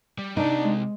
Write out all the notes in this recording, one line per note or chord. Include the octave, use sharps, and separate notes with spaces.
G3
C3 D4 D#4 D5
G#3